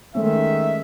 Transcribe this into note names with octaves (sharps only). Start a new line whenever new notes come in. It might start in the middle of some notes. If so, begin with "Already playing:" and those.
D#3 G#3 A3 C#4 E5